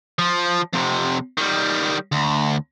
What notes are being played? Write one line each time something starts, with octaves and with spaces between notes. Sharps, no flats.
F3
F2 C3
D#3 G3
D2